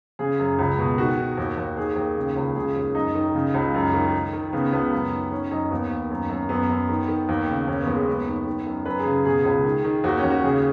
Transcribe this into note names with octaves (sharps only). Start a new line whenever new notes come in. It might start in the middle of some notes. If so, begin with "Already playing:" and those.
C#3 G#4
F#2
C#2
B2
D#3 F#4
D#3
D#2
D#2
D#3 G#4
D#2
C#3
C#2
C#3 G#4
D#2
F#2 D#4
D#3
C#3
C#2
F#2
D#3
D#3
D#3
C#3 B3
C#2 B3
F#2
D#3
D#3 C#4
F#2 D#4
D#2 B3
D#2
F#2
F#2
F#2 B3
F#2
D#3
D#3
D#2
C#3
D#2 C#4
B3
D#2
G#3
F#2 B3
D#3
D#3
F#2
F#2 B4
G#4
C#3
B2 G#4
C#2
D#3
D#3
D#2 F#4
C#4
D#2
F#4
C#3 G#4